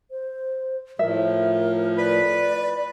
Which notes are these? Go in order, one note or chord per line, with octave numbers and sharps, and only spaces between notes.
C5
A2 F3 A#4 E5
B4 D5 B5